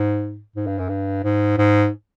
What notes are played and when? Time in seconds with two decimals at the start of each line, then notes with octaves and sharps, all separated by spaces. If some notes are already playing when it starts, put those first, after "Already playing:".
Already playing: G#2
0.56 G#2
0.67 G2
0.79 F#2
0.89 G2
1.24 G#2
1.58 G#2